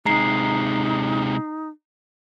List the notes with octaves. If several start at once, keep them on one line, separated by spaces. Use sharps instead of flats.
C3 G#3 D#4 A#5 C7